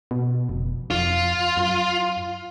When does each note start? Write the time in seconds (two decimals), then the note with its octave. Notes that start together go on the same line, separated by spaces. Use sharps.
0.11 B2
0.49 F1
0.90 F2 F4
1.57 F#2